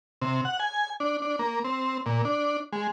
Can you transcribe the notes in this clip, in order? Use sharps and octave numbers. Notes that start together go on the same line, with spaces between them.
C3
F#5
G#5
D4
D4
A#3
C4
A#2
D4
G#3